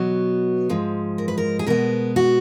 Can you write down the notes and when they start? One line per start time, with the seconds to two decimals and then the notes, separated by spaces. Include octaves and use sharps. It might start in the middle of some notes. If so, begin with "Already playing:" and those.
Already playing: B2 F#3 B3
0.69 G#2 F3 G#3
1.18 A#4
1.28 B4
1.38 A#4
1.59 G#4
1.66 B2 G#3 B3 A#4
2.16 F#4